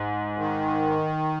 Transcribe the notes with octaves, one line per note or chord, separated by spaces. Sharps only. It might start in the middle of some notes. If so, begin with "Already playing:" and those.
Already playing: G#2
D#3